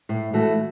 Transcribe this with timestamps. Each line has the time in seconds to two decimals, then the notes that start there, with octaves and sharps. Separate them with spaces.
0.09 A2
0.33 E3 A3 F#4